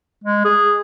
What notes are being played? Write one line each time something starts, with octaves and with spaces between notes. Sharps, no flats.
G#3
G#4